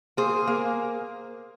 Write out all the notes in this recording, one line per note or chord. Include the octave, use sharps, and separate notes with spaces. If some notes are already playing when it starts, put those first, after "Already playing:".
A#3 G#4 C5
A#3